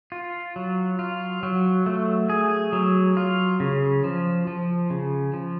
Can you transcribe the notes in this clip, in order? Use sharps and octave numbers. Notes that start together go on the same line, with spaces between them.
F4
F#3
F4
F#3
A3
G#4
F#3
F4
C#3
F3
F3
C#3
F3